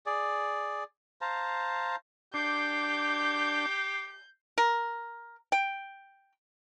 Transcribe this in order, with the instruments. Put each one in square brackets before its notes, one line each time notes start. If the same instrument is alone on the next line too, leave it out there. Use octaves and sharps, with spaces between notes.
[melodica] G#4 D5
C5 F5 A5 A#5
[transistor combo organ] D4 [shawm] G4 [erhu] G6 [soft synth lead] C7
[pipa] A#4
G5